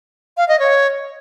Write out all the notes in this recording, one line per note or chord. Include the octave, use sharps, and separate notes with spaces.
F5
D#5
C#5